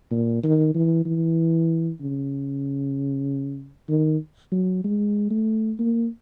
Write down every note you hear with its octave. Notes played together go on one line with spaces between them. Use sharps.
A#2
D#3
E3
E3
C#3
D#3
F#3
G#3
A3
A#3